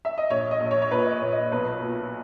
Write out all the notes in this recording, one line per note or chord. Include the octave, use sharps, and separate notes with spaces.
E5
D#5
A#1 C#5
D#5
A#1
C#5
C#5
A#2 B4
D#5
C#5
A#2
D#5
B1 B4
A#2